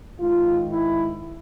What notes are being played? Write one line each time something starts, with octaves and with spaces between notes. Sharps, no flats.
G#2 D#3 F4
E4